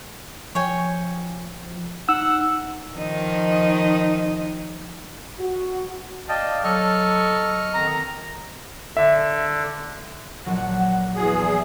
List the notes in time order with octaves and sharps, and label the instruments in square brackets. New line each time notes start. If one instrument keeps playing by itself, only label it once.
[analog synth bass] F3 [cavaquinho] C#5 G5 G#5
[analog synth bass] D#4 [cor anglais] F#5 [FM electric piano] E6
[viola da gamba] D#3 F3 D#4
[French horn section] F#4
[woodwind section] D5 A5 [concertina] D#5 G5 [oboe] F5
[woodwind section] F#3 [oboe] A4 [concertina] D#5 C#6 F6
[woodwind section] D3 D#3 C4 [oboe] A#5
[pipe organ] D3 [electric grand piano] E5
[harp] A#1 F#3 [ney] F#5
[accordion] E2 G#4 [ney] F#4
[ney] E5